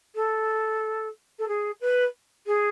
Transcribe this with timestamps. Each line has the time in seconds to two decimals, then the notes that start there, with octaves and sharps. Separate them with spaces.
0.15 A4
1.39 A4
1.48 G#4
1.81 B4
2.46 G#4